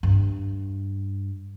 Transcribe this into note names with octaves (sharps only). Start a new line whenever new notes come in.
G2